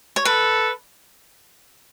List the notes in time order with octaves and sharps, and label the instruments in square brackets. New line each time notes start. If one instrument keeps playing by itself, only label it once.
[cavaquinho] C#5
[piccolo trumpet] A4 [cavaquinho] B4